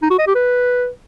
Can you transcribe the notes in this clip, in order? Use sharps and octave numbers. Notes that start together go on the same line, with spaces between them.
D#4
F#4
D#5
G4
B4